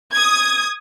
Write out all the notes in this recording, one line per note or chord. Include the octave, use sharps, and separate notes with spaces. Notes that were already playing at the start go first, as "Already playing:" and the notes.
D#6 G#6